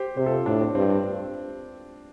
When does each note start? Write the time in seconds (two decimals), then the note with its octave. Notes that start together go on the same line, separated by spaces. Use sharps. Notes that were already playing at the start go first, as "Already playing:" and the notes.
Already playing: G4 C5
0.17 C3 G4 C5
0.26 F4 A4
0.46 A2 D4
0.61 C4
0.75 G2 C4